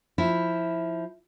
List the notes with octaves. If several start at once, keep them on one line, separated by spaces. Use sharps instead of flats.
F3 E4